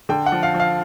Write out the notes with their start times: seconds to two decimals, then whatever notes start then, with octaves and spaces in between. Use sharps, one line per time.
0.09 D3 G5
0.26 F#5
0.32 F3
0.43 F5
0.54 F3
0.60 F5